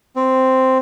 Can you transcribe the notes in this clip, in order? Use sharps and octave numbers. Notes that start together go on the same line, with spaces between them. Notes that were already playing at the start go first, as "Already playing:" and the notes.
C4